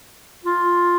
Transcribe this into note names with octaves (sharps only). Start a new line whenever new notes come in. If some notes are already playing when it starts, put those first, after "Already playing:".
F4